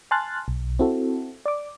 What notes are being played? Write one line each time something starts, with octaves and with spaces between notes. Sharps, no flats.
G#5 A5 C6 F6 F#6 A6
B1
C4 E4 F#4 A4
D5 D6